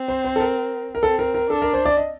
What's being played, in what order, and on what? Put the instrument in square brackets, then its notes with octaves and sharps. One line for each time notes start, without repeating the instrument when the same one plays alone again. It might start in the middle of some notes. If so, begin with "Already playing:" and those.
Already playing: [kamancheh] C4
[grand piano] C5
C5
A4
A#4
A#4
[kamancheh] C4 [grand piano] A4
[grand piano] A#4
A#4
[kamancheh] D4 [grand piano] A4
[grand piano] A#4
C5
D5
D#5